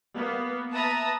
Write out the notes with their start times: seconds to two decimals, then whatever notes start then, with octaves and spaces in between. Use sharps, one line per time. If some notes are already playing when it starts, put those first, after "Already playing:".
0.14 A#3 B3
0.71 B4 E5 A5 A#5 D#6